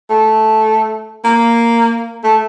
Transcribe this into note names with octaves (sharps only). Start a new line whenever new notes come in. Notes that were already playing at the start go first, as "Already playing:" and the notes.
A3
A#3
A3